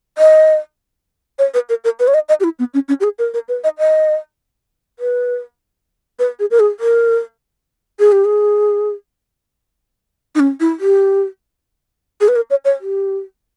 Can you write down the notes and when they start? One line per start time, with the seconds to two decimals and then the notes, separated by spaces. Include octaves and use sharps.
0.18 D#5
1.39 C#5
1.54 B4
1.69 A#4
1.84 A#4
2.00 B4
2.08 C#5
2.14 D#5
2.29 D#5
2.40 G4
2.44 E4
2.59 B3
2.74 C#4
2.88 C#4
3.00 G4
3.04 G#4
3.19 A#4
3.34 A#4
3.49 B4
3.64 D#5
3.79 D#5
4.99 B4
6.19 B4
6.39 G#4
6.51 A#4
6.60 G#4
6.80 A#4
7.99 G#4
8.12 G4
8.25 G#4
10.35 D#4
10.40 C#4
10.60 E4
10.80 G4
12.21 G#4
12.28 B4
12.36 A#4
12.50 C#5
12.65 C#5
12.81 G4